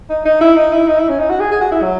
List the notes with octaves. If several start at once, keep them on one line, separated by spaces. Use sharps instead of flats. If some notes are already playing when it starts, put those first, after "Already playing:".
D#4
D#4
E4
D#4
E4
D#4
E4
C#4
D#4
F#4
G#4
G#4
F#4
E4
F#3